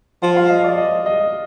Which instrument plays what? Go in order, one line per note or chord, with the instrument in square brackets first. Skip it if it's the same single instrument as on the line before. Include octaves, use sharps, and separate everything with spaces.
[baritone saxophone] F3 [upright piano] F5
[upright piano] F5
D#5
D5
D#5
D#5